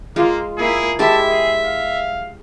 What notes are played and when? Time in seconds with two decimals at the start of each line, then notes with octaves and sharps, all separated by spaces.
0.16 G#3 A#3 F4
0.58 A#3 E4 G#4
0.99 G#3 E4 G4 E5 A5
1.29 G#4
1.64 F5